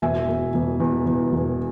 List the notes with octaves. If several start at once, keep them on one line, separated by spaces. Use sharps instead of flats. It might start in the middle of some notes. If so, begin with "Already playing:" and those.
E1 E5 G#5
E1
E1
E2
E2
E1